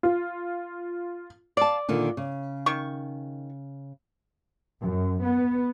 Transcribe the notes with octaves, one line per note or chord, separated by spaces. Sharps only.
F4
D5 F5 A5
A#2 D3 D#3
C#3
D#3 C#6
F#2
B3